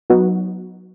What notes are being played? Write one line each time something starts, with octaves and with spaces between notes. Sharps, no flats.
F#3 B3 D#4 F#4